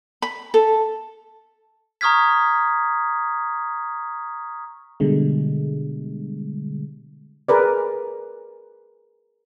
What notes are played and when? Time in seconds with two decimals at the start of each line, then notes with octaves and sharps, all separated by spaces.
0.22 B5
0.54 A4
2.01 A#5 C#6 D#6 F6 G#6 B6
5.00 B2 D3 G3 G#3
7.49 G#4 A#4 B4 D5